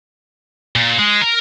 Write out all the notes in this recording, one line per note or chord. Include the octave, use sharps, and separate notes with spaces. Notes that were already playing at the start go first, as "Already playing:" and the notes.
A#2
G#3
A#4